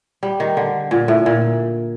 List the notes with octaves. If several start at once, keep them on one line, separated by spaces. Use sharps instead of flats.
G3
D#3
D3
A#2
A2
A#2